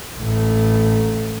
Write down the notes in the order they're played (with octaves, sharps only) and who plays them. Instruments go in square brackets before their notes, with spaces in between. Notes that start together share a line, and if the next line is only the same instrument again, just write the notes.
[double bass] A1 A3